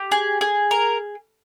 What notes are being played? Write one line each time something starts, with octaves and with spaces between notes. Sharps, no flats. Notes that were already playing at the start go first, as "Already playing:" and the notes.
Already playing: G4
G#4
G#4
A#4